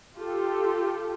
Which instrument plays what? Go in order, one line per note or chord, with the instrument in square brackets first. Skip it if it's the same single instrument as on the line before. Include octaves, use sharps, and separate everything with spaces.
[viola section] F4 G4 A4